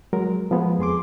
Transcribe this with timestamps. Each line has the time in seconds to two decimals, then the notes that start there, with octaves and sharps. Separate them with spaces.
0.13 F#3 G#3 A#4
0.51 F3 G#3 B3
0.79 F2 G#4 C6 D6